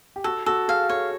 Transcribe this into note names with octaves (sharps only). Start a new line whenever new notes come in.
G4
F#4 A4
F#4 A4
G#4 F5
A4 C#5